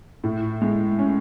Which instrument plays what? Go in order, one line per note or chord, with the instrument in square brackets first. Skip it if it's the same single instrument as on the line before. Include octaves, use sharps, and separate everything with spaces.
[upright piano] A2
G#3
C#4